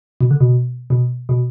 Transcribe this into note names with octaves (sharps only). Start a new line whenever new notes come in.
B2
D3
B2
B2
B2